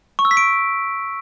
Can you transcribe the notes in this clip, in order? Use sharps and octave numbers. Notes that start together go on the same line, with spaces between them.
C#6
E6
B6
D7